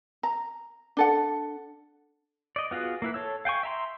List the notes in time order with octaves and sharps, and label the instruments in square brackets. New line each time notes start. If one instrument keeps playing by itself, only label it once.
[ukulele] A#5
D4 A4 F#5
[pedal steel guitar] D5 D#5
B3 F4 F#4 G#4
A#3 E4 B4
A4 C#5 E6
F5 G5 G#5 C#6
E5 A#5 C6